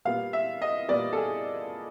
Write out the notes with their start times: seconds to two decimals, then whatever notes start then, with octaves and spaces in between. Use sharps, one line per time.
0.05 A#2 G3 B3 F5
0.33 E5
0.62 D#5
0.89 A#2 G3 B3 D5
1.13 A4
1.17 G#4